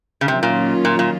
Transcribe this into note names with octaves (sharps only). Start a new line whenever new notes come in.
C#3
C3 D#3 F#3 A#3 C#4 F4
A#2
A#2
A#2